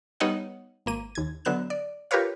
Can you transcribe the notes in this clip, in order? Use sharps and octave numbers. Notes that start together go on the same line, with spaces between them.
G3 B3 D#4 C#5 D#5 F#5
G#1 A#3 D#7
D#2 G#6
D3 F#3 B3 F#6 E7
D5
F4 G4 A#4 B4 C#5 F5